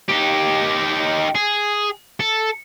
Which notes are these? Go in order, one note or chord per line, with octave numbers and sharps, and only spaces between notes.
D#4 G4
G#4
A4